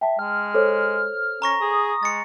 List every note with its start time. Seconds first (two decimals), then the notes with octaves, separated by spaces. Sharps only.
0.01 E5 G5 A5
0.19 G#3 F6
0.54 A4 C5 C#5
1.42 C#4 A#5 C#6 A#6
1.61 G#4 D#6
2.03 G#3 A6 C#7